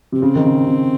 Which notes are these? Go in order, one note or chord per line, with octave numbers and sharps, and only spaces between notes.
C3
C#3 C4
D#3
C#3
C#3